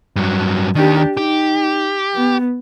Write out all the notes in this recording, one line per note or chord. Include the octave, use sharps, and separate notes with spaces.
G2 F#3
D#2 D#3 D4 G4
D#4 G4
B3